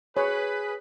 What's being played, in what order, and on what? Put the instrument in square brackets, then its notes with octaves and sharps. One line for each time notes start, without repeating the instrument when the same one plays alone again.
[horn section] G#4 B4 [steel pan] C#5